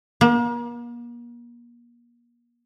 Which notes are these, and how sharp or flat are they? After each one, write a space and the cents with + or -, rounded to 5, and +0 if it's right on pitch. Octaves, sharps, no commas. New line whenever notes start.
A#3 +40